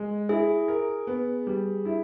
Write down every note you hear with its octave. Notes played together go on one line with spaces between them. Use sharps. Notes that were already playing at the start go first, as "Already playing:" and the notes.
Already playing: G#3
E4 G#4
A#4
B3
G3
E4